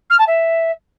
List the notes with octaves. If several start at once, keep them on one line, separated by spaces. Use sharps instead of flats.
F6
A5
E5